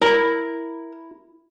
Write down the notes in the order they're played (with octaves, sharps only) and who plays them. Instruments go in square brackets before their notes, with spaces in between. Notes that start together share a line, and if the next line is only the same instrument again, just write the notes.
[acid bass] E4 [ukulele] A#4